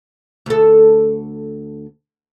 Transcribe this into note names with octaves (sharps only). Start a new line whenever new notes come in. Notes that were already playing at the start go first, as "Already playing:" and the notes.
D2 A4